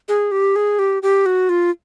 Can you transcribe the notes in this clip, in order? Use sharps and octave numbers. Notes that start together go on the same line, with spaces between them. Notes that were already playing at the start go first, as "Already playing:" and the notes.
G#4
G4
G#4
G4
G4
F#4
F4